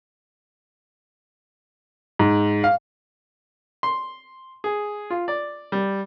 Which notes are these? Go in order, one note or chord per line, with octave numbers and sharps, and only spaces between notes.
G#2
F5
C6
G#4
F4
D5
G3